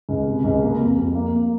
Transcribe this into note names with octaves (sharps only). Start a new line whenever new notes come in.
C#2
C3
C#2
A#3
F2
F2
A#3
A#3